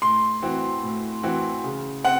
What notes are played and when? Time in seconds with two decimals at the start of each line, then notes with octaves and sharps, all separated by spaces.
0.02 A2 C6
0.42 E3 C4 F#4
0.83 A2
1.23 E3 C4 F#4
1.64 C#3
2.04 C4 F#5